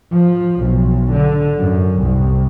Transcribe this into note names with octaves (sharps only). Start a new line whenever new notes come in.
F3
B1
D3
F#2
C2